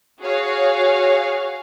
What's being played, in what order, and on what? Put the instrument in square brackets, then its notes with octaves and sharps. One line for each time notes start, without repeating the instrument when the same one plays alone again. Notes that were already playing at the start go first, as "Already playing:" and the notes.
[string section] F#4 G#4 C#5 F5